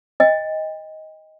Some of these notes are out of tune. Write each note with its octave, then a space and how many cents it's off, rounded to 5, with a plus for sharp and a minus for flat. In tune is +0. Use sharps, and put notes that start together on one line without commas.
D#5 +10 G5 +35